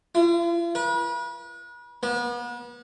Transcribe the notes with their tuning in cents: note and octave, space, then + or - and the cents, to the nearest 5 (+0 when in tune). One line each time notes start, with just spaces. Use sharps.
F4 -45
B4 -40
B3 -40